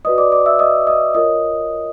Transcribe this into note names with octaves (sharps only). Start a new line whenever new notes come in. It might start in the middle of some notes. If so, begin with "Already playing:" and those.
F#4 B4 D5 D#5 D#6
D5 D6
D5 D6
E5 E6
D#5 D#6
D#5 D#6
F4 A#4 C#5 D#5 D#6